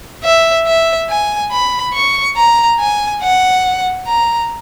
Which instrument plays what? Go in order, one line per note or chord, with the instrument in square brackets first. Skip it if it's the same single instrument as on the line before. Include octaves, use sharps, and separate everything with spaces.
[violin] E5
E5
G#5
B5
C#6
A#5
G#5
F#5
A#5